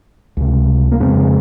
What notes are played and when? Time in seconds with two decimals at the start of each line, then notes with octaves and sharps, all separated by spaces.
0.37 C#2 C3
0.92 A#3
1.00 F2 C#3 G#3 C4